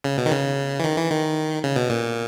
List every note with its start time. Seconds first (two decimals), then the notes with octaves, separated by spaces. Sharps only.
0.04 C#3
0.18 B2
0.26 D#3
0.31 C#3
0.80 E3
0.84 D#3
0.97 E3
1.11 D#3
1.64 C#3
1.76 B2
1.90 A#2